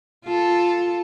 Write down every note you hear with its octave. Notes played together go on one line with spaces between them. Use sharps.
F4 A4